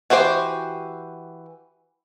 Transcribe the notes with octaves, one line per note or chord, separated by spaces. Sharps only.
E3 F#4 G4 C5 G5